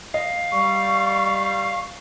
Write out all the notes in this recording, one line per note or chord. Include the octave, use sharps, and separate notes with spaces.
D#5 F5
G3 C#6